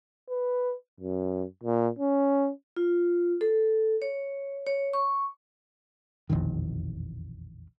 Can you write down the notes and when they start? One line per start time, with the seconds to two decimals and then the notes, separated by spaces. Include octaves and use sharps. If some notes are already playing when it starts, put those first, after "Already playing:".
0.30 B4
1.00 F#2
1.63 A#2
1.98 C#4
2.76 F4
3.41 A4
4.02 C#5
4.67 C#5
4.93 C#6
6.29 E1 A#1 F2 D#3